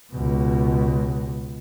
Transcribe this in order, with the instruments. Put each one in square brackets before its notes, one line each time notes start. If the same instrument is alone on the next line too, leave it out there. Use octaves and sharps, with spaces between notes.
[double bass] C#2 B2